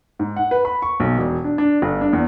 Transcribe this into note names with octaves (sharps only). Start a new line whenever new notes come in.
G#2
F#5
B4
B5
C#6
B1
E1
D4
D4
G1
D4
E2